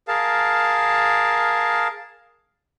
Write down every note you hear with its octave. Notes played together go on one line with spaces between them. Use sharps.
G#4 A#4 F5 A5